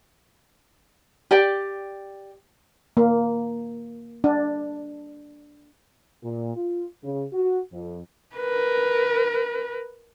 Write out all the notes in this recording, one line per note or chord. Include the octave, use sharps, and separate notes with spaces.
G4 D5 G5
A#3
D4
A#2
F4
C#3
F#4
F2
A#4 B4